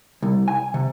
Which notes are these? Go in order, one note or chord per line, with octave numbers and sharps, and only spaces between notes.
C2
G#5
C3